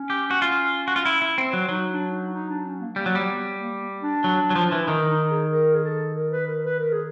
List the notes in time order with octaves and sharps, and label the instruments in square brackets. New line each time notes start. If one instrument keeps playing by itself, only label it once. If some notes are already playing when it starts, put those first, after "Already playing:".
Already playing: [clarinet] C#4
[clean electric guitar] G4
F#4
F4
F#4
F4
E4
E4
C4
F#3
[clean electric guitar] F#3 [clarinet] D#4
[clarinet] D4
D#4
D#4
D4
C#4
A#3
[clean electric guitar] G3 [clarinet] A#3
[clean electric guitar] F#3
G3
[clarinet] B3
A#3
D4
[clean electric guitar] F#3
F#3
F3
E3
[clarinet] E4
[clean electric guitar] D#3 [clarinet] D#4
[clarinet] D#4
G#4
A#4
G#4
A4
A#4
B4
A#4
B4
A#4
G#4